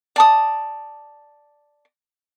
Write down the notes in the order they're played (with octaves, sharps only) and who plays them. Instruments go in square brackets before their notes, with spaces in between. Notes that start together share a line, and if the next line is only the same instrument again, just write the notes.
[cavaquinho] D5 A5 D#6